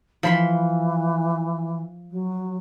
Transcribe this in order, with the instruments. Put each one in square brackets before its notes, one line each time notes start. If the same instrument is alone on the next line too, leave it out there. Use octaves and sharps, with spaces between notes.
[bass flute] E3 [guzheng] F3 B5 C6
[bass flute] F#3